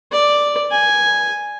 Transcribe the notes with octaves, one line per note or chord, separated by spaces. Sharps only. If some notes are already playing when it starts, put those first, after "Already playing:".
D5
G#5